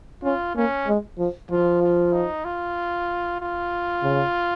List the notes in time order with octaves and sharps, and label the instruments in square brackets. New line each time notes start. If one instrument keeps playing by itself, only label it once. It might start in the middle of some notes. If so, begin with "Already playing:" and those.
[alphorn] C#4 [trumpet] F4
[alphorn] A#3 [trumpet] C#4
[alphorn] G#3
F3
[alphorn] F3 [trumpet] F4
[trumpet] F4
D#4
F4
F4
[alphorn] C#3